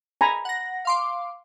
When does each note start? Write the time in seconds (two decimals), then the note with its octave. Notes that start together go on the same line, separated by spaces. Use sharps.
0.21 G#5 A#5 B5
0.45 F#5 A#6
0.85 F5 C6 D6